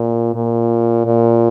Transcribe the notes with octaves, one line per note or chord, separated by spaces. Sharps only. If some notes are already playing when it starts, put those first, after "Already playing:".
Already playing: A#2
A#2
A#2